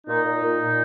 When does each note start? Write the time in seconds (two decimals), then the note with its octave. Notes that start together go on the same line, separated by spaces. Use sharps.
0.07 A#2 D#4
0.24 A#2
0.41 A#2
0.59 A#2